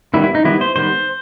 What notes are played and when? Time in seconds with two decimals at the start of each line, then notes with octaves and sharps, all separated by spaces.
0.14 D#3 G3 B3 E4
0.24 E4
0.35 D#4
0.44 D#3 G3 B3 E4
0.61 C5
0.76 D#3 G3 B3 C5